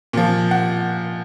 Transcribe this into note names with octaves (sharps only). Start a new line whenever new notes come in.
A#2 F3
F#5